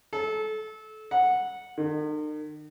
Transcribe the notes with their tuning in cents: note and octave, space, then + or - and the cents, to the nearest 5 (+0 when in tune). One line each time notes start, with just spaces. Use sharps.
A4 -25
F#5 -10
D#3 -45